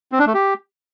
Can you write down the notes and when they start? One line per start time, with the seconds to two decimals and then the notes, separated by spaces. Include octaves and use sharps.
0.12 C4
0.19 D4
0.27 A3
0.34 G4